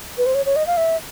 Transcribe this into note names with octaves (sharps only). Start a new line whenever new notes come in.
B4
C5
C#5
C#5
D#5
F5
E5